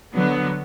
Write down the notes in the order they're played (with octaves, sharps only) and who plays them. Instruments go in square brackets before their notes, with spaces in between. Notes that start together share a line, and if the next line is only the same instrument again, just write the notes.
[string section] D3 F#3 B3